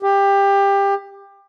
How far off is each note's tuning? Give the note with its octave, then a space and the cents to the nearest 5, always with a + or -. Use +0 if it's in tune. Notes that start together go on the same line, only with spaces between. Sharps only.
G4 +20